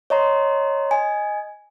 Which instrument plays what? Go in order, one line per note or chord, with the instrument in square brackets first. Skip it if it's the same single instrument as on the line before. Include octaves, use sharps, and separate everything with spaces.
[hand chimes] C#5 D#5 A#5 C6
D#5 G#5